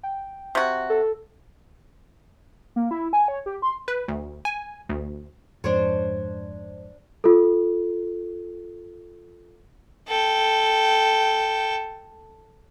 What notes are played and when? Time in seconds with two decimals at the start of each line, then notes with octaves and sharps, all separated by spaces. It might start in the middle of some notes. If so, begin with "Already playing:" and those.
0.03 G5
0.55 C3 F#4
0.90 A4
2.76 A#3
2.91 E4
3.13 G#5
3.28 C#5
3.46 G4
3.62 C6
3.88 B4
4.08 D2
4.45 G#5
4.89 D2
5.64 F2 G#2 F3 D4 C5 C#5
7.24 F4 A4
10.08 A4 G5